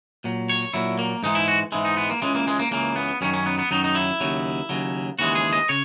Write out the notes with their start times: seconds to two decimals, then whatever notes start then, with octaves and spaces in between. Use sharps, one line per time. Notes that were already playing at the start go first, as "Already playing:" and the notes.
0.24 A#2 F#3
0.49 C#5
0.74 A#2 F#3 E4
0.99 A#3
1.23 G#2 E3 G#3 D#4
1.35 E4
1.48 F#4
1.72 G#2 E3 G#3 E4
1.85 D#4
1.97 B3
2.10 A#3
2.22 C#2 C#3 E3 G#3
2.35 A#3
2.48 G#3
2.59 A#3
2.71 C#2 C#3 E3 A#3
2.96 B3
3.21 F#2 D#3 F#3 C#4
3.34 C#4
3.46 B3
3.59 B3
3.71 F#2 D#3 F#3 D#4
3.84 D#4
3.95 E4
4.20 D#2 C#3 F#3
4.69 D#2 C#3 F#3
5.19 D#2 C#3 E3 G#3 F#4
5.35 G#4
5.53 D#5
5.69 C#3 C#5